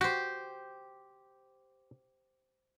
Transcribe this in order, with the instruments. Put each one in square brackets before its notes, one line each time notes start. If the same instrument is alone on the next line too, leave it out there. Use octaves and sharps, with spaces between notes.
[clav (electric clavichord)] F#4 [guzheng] G4 C5